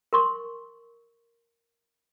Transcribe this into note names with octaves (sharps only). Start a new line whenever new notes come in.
A#4 C6 C#6